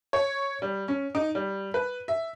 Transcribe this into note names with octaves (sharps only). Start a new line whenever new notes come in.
C#5
G3
C#4
D#4
G3
B4
E5